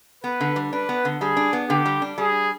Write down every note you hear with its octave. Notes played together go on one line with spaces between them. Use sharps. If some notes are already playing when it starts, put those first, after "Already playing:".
B3 B4
D3
G3
D4 B4
B3
D3
G3 G#4
D4
B3
D3 G4
G3
D4
G3 G#4